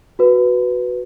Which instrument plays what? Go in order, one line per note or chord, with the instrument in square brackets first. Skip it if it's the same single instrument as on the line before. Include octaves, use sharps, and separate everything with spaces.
[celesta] F#4 B4